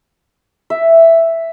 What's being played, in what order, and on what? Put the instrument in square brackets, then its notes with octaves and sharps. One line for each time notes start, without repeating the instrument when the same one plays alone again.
[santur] E5